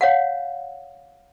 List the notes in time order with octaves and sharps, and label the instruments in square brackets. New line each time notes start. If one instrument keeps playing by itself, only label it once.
[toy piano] C#5 F5 F#5